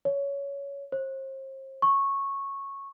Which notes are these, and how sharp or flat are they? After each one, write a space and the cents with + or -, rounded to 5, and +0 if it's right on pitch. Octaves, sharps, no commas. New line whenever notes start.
C#5 +15
C5 +40
C#6 -10